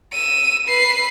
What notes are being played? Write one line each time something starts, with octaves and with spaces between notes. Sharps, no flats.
E6 D#7
B4 C7